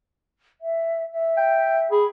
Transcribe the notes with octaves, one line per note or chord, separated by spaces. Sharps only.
E5
E5
G5
G#4 B5